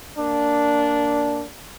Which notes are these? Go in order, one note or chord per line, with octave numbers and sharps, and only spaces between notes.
A#3 D4